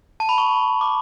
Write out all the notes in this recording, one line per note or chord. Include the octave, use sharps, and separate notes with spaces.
A5
B5
C#6
D6